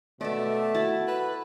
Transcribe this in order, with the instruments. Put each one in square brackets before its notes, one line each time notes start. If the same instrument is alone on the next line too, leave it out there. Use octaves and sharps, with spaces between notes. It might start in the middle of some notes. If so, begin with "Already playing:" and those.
[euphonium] B2 [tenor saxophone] A3 [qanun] A4 D5
[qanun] E4 A5 [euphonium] F#4
[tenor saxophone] B4